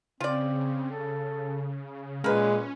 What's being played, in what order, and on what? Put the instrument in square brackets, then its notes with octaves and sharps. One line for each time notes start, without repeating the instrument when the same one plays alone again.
[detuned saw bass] C#3 [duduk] C4 [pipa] F4 D5
[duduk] A4
[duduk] A#2 [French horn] G#3 [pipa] A#3 B4 [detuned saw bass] C#4